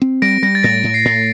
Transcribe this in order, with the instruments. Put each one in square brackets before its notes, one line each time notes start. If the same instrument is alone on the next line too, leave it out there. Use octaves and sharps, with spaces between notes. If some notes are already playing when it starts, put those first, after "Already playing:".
[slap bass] C4
[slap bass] G3 [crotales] A#6 D7
[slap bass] G3 [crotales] A#6
[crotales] A6
[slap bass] A2 [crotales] A#6
[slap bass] A2
[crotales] C7
[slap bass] A2